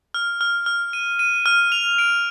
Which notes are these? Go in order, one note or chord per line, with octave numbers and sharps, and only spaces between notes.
F6
F6
F6
D#7
D#7
F6
F7
D7